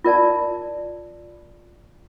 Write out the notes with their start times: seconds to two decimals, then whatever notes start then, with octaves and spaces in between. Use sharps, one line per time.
0.04 F4 A#4 D5 A5